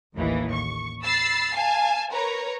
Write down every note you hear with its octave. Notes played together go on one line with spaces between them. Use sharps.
A1 D#2 E3
C#6
B5 E6 A6 C7
F5 G#5 A5
A#4 B4 C#5 A#5